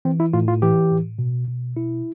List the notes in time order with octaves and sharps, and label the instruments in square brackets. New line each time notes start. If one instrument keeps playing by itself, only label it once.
[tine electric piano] E3 C4
E4
A2 F4
F4
E3 G4
A2
B2
B2
B2 E4